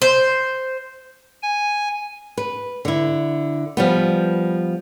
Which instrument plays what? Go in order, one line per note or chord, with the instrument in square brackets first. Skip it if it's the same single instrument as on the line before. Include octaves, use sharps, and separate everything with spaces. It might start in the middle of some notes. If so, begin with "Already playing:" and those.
[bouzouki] C5
[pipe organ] G#5
[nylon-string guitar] B4
D3 E4
F3 G3 B3